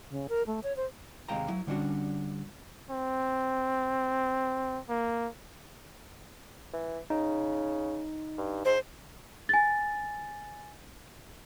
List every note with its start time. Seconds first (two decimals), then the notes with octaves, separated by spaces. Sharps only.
0.10 C#3
0.29 A#4
0.47 A3
0.63 C#5
0.77 C5
1.28 D#2 C3 G#3 F5 G5 A#5
1.49 F#3 E4
1.67 D3 G3 C#4 D4 F#4
2.90 C4
4.89 A#3
6.73 E3
7.10 C#3 D#4
8.38 G2
8.65 G#2 C5
9.49 G#5 A6